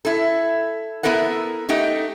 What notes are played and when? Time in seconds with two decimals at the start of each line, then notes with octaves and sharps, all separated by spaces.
0.05 E4 A4
1.03 B3 E4 A4 A#4 F#5
1.69 A3 D#4 G4 F#5